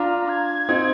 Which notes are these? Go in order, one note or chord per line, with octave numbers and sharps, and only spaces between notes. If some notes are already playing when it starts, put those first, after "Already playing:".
Already playing: D4 F4 A#5
G#6
C4 D#4